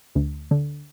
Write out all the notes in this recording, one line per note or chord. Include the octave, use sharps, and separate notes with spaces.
D2
D3